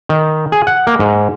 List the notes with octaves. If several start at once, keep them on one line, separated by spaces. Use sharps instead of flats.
D#3
G#4
F#5
A#3
G#2